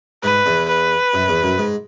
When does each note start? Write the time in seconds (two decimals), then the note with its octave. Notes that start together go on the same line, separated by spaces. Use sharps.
0.23 G#2 B4
0.46 E2
0.68 B4
1.14 F#2
1.28 E2
1.43 F#2
1.58 G#2